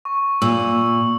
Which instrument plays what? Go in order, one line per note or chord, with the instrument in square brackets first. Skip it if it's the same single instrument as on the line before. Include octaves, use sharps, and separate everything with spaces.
[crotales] C#6
[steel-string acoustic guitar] A#2 [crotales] E6